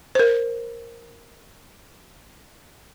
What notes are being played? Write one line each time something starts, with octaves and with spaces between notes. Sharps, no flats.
A#4 C5